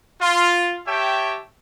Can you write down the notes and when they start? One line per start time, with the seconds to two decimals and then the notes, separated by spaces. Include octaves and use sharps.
0.21 F4
0.86 G4 C#5 E5 G5 A5